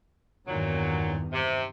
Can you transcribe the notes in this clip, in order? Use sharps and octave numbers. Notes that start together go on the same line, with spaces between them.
E2 G2 A#2 D#3 F#3
C3